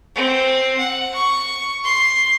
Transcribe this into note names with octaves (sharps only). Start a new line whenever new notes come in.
C4
F#5
C#6
C6